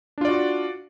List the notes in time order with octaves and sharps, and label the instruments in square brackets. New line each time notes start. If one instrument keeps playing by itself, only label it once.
[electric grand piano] D4
F4
D5
F#4